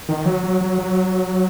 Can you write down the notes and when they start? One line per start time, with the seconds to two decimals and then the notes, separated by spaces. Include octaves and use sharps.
0.09 D#3
0.25 F#3
0.43 F#3
0.61 F#3
0.78 F#3